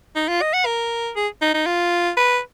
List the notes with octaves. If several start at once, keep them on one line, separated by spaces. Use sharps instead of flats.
D#4
F4
D#5
F#5
A#4
G#4
D#4
D#4
F4
B4